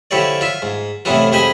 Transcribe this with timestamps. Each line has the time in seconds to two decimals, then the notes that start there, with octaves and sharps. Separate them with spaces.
0.11 D3 F3 E4 G4 C#5 D5
0.41 F4 E5
0.62 G#2
1.05 F2 A2 C3 E3 B3 F4
1.32 F2 G#3 G4 C5 G#5 B5